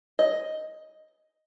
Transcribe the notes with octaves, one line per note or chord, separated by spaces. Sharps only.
D#5